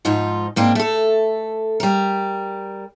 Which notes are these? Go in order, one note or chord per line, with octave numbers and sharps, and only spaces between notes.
G#2 F3 D#4 F4
G#2 A#3 C4 D4
A3 A4
G3 A#4